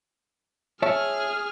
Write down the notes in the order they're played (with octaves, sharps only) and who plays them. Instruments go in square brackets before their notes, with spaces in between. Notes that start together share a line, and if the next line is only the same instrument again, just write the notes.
[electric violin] G#4 F6 [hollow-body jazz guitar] C#5 E5 A5